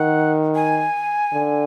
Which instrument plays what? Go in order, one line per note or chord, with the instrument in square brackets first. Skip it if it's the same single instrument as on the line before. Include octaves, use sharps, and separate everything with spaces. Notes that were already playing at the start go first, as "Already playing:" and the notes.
Already playing: [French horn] D#3 [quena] F#5
[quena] G#5
[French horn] D3